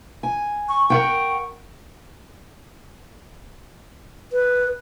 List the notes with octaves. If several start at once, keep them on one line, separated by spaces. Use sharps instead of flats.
G#5
C#6
A#4 F#5 G5 C#6
B4